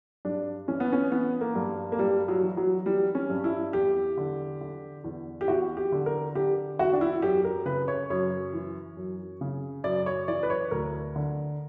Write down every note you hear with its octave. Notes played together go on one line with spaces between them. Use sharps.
G2 D4
E3 C#4
B3
C#4
E3 B3
A#3
G2
A#3
G2 G3
F#3
E3
F#3
E3 G3
C#4
G2
E4
E2 G4
D3
D3
E2
G4
E2 F#4
G4
D3
A#4
D3 G4
E2 F#4
D4
E4
F#2 G4
A#4
C#3 B4
C#5
F#2 C#5
E3
F#2
C#3
F#2 D5
C#5
E3 D5
B4
C#5
D2 A#4
D3